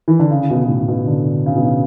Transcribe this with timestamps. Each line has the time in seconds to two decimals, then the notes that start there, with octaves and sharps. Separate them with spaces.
0.08 E3
0.20 D3
0.31 C#3
0.50 B2
0.63 B2
0.69 A2
0.79 C#3
0.88 B2
1.07 D3
1.46 C#3
1.56 B2
1.65 C#3